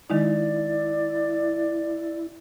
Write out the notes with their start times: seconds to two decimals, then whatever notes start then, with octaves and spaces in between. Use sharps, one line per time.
0.10 D#3 G#3 D#4 E4 D5